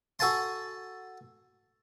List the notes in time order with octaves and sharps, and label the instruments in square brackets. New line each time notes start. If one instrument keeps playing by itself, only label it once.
[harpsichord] F#4 A4 F#5 G#5 A5 C6